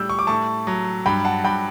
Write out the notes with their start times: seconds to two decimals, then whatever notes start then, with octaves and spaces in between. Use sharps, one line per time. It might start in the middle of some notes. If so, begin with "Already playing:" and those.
Already playing: A2 G3 E6 G6
0.09 C#6
0.19 D6
0.27 A2 A5 C#6
0.67 F#3
1.06 G2 G5 B5
1.25 F#5 A5
1.44 G2 G5 B5